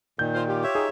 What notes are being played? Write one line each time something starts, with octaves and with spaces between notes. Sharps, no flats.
A#2 D#3 G6
F4 A#4 C5
F4 G4
C#5 E5
D#4 G#4